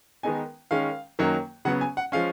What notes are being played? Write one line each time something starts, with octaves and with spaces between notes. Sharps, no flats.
D#3 G#3 B3 D#4 G#5
D#3 G#3 C#4 F5
F#2 D#3 F#3 A#3
C#3 F#3 B3 F#5
G#5
F#5
F3 G#3 C#4 F5